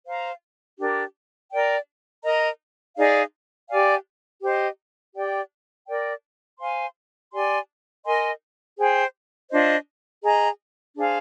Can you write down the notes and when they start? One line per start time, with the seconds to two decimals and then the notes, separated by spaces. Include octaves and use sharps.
0.06 C5 F5 A#5
0.79 D4 G4 A#4
1.51 A#4 D5 G5
2.24 A#4 D#5 A#5
2.97 D#4 G#4 D5 F5
3.69 G4 D5 F5 G#5
4.42 G4 C5 D#5
5.15 G4 D5 G5
5.87 A#4 D5 G5
6.60 C5 F5 G#5 C6
7.33 G4 D5 G#5 C6
8.05 A#4 D#5 G#5 C6
8.78 G#4 C5 G5
9.50 D4 F4 C5 D#5
10.23 G#4 D#5 A#5
10.96 D4 G#4 C5 F5